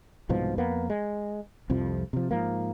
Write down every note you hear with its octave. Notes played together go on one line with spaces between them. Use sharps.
C2 G#2 B2 F3
F2 A#3 B3
G#3
C2 F2 C3 F3
C3 F3
G#2 F3 A#3